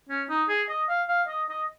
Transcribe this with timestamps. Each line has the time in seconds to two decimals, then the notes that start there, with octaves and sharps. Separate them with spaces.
0.09 C#4
0.30 D#4
0.49 G#4
0.69 D#5
0.89 F5
1.08 F5
1.28 D#5
1.49 D#5